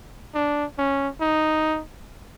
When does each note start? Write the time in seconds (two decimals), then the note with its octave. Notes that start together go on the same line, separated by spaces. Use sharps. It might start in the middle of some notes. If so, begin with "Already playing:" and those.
0.34 D4
0.78 C#4
1.21 D#4